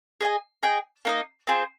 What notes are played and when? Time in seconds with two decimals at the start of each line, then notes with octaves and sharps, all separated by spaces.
0.21 G#4 D#5 G#5
0.63 G#4 D#5 G5
1.05 A#3 D#4 A#4 D#5
1.47 C4 F4 G#4 C5